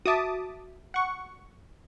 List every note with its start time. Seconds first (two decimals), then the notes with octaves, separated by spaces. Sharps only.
0.06 F#4 E5 A5 D6 D#6 B6
0.94 F#5 C#6